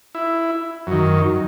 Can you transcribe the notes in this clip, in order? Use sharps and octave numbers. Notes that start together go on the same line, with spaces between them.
E4
F#2 D#3